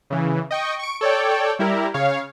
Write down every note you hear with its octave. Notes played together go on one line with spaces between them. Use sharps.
C#3 E3
D#5 G5 C#6
C#6 D7
A4 C#5 D5 G5
G3 E4 G4 A#4
C#3 C#5 F5